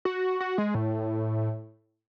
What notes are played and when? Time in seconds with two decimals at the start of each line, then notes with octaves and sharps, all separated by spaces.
0.05 F#4
0.40 F#4
0.58 G#3
0.75 A2